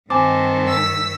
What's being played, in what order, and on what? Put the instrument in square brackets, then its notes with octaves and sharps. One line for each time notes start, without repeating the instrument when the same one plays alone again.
[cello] G2 D#3 [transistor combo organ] C4 A5 [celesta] G#5 D6
[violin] E6 B6